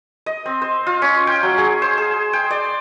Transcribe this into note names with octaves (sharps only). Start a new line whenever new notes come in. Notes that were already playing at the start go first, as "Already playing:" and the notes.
D#5
C4
C5
F4
C#4
G5
F#3
G#4
C5
G#4
G5
D5